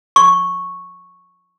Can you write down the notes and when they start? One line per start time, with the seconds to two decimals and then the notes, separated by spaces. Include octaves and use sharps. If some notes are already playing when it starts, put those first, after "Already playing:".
0.16 C#6